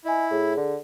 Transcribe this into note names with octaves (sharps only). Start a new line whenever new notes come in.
E4 D#5 G#5
A2 G#4
D3